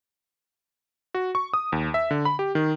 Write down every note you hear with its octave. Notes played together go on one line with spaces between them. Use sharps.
F#4
C#6
D#6
D#2
E5
D3
B5
G4
D#3